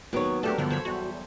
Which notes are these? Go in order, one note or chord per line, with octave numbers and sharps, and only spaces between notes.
D#2 F#3 B3 C#5 D6
A3 D4 G4 A4 A#4
G2 D3 F3 B3
D3 C5 C#5 B5
E2 G3 F#4